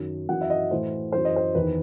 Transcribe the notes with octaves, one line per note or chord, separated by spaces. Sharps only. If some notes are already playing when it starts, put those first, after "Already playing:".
Already playing: F#2 D#3
F#2 E3 F#5
E5
D#5
A2 E3 C5
F#2 E3 C5
D#5
C5
E2 D#3 B4